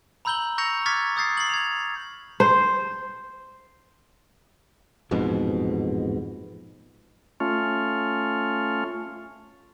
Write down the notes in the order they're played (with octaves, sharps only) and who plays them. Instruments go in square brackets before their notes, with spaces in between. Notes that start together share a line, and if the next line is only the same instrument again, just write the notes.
[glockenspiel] A#5 B5 E6 G6 F#7 G7
C#6 E6 G6 A#6 C#7 F7
C#6 D6 F6 G#6 A6 B6
C#6 D#6 G6 A6 C7
C7 F#7
G#6 F7
[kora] C5
[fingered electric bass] A1 F2 G#2 B2
[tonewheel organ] A3 C#4 F4